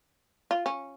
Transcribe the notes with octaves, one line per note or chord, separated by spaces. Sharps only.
F4
C#4